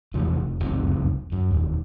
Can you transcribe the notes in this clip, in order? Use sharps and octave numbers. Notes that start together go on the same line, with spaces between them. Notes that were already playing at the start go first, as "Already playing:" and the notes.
E2 C3 E3 F3
F1
F1 C#2 F#2 C4
F#2
E1 D#2